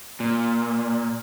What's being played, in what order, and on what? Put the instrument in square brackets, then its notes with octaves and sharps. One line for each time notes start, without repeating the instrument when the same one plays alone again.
[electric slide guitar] A#2